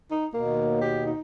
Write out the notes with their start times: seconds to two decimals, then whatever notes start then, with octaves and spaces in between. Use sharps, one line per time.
0.11 D#4
0.34 D#2 B2 A#3
0.81 G4
1.06 D#4